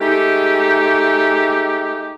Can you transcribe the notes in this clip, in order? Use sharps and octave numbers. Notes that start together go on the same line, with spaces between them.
G#3 A3 D#4 G4